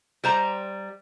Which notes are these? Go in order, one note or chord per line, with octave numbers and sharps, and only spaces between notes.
G3 C5 A#5